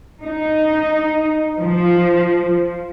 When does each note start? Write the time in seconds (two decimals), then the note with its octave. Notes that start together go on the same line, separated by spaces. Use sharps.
0.23 D#4
1.59 F3